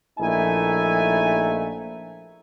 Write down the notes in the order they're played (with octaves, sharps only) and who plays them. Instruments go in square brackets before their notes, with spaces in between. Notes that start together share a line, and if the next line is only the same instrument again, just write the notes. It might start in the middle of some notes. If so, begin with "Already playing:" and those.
[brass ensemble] A#1 A3 D#4 E4 G#5